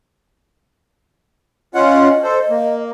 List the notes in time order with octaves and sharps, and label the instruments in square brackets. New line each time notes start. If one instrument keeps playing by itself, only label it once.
[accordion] C#4 F4 F#5 [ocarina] D#5
[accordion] A4 C5
A#3